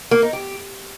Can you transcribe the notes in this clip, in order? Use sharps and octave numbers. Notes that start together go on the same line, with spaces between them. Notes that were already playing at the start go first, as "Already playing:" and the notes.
A#3
D#4
G4